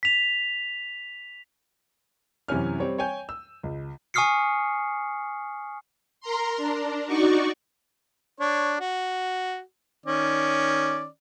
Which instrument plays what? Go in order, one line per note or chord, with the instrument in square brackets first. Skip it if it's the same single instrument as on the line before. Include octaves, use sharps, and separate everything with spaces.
[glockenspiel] B6 F7
[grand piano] F#2 C3 E3 C#4 G#5 F6
G3 C4 C#5
C#5 G5 G#5 G6
E6
C#2
[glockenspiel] G#5 C#6 D#6 F6 C7 C#7
[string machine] A#4 A#5 C6
D4
D#4 F#4 D5 C#6
[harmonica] D4 C#5
F#4
D#3 C#4 D5